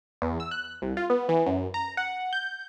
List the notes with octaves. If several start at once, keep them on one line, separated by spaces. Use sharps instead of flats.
E2
E6
F#6
C2
F4
B3
E3
F#2
A#5
F#5
G6